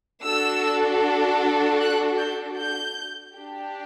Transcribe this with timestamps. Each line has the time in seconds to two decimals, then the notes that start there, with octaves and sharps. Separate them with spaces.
0.24 D4 F#4 A4 E6
1.80 F#6
2.18 G6
2.57 G6
3.36 D4 G4